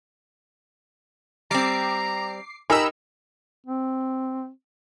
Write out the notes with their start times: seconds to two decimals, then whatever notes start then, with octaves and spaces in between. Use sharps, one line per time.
1.51 G3 C4 A#5 D6 C7
2.70 D#4 G4 A#4 G#5 A#5 B5 E6
3.67 C4